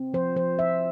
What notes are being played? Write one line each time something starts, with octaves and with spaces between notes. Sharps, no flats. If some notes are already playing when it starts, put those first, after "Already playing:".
Already playing: C4
F3 C5
F3 C5
F3 E5